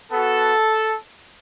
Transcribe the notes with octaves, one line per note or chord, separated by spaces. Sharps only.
B3 F#4 A4